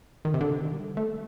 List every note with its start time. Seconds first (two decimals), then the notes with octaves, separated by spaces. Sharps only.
0.25 D#3
0.34 C3
0.41 D3
0.57 D#3
0.73 G3
0.97 A3